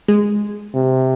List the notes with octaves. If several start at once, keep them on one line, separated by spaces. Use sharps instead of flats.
G#3
C3